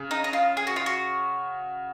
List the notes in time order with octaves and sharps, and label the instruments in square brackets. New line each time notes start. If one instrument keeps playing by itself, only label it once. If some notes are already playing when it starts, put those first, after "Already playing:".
Already playing: [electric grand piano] C#3
[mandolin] D#4
D#4
F4
G#4
F#4
F4
F#4